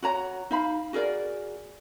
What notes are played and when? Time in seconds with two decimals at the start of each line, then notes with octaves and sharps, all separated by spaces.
0.02 F#4 C#5 A#5
0.51 D#4 F5 B5
0.93 F#4 G#4 A#4 D5